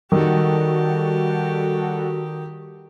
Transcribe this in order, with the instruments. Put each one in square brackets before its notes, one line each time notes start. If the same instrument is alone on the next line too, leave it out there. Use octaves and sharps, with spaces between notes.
[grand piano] D#3 [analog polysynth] G3 F#4 A4 [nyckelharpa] G4